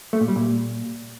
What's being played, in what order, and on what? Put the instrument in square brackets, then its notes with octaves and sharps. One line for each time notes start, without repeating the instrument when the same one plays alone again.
[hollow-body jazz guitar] A3
A#2
G3
A#2